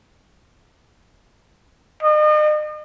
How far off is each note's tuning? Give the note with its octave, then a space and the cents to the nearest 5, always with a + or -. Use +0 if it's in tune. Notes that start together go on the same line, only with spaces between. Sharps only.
D#5 -40